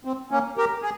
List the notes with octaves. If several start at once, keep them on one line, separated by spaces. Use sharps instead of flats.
C4
A#3 C#4
G4 A#4
G#4